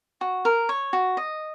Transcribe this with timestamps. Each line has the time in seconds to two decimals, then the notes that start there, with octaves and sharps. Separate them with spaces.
0.21 F#4
0.45 A#4
0.69 C#5
0.93 F#4
1.17 D#5